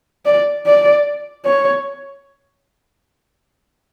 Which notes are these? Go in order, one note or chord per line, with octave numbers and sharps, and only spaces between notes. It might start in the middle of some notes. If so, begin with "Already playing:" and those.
D5
D5
C#5